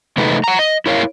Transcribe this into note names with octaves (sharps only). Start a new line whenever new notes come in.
C3 E3 G#3 A3 D#4 B4
F#5 A#5
D#5
E4 A#4 C#5 F5